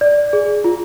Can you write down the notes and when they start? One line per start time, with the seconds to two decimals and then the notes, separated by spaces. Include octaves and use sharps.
0.01 D5
0.33 G#4
0.64 F4